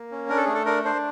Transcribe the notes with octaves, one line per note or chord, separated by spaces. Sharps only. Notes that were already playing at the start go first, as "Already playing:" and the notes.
Already playing: A#3
C#4
D4 A#4
A4
A3 G#4
A4
D4 A#4
D4 C5